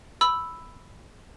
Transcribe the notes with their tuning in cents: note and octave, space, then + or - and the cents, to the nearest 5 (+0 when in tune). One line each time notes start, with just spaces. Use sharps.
B5 +5 E6 +0